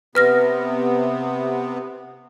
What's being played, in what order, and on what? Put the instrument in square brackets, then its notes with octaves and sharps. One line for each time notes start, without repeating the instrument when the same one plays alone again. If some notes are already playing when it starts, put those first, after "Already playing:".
[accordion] C3 B3 [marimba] B4 F6 A#6